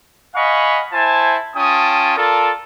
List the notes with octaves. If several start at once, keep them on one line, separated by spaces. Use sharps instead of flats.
D#5 F5 F#5 G#5 B5 C#6
E4 C5 G#5 A5
C#4 F4 G5 A5 D#6
F4 A4 A#4 D5 A5